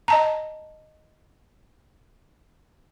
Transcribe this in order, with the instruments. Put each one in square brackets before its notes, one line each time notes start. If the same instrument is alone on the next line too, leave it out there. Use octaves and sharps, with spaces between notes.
[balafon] D#5 A5 A#5